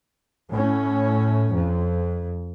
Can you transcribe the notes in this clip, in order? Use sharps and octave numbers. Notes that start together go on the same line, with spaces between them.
A2 C#4
F2